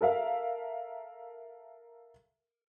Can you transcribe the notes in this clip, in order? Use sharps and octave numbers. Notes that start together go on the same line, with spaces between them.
A4 A#4 E5 F5